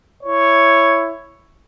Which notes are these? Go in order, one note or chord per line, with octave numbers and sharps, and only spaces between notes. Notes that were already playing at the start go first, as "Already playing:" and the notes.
E4 C#5